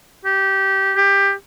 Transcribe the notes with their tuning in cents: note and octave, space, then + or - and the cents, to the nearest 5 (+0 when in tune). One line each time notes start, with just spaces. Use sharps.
G4 -15
G4 +15